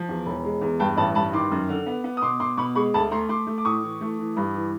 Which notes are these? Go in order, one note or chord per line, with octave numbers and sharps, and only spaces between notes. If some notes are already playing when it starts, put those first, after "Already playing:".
Already playing: F3
E2
E1
G#3
E2
G2 G5 A5
A1 A5 B5
G2 A5 B5
D#3 C6 D6
F#2
D3
B3
B3
D#6
B2 C6 D6
B2 C6 D6
B2 B5 C#6
G#3 B5 C#6
D2 A5 B5
A3 A#5 C6
A3 C6 D6
A3
D6
A2 C#6 D#6
E3
A3
E3
G2
E3